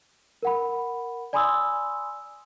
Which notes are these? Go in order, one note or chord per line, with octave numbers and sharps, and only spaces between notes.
A#4 F#5 B5
D5 G#5 B5 C6 D#6 E6